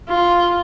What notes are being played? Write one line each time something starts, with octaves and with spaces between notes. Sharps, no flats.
F4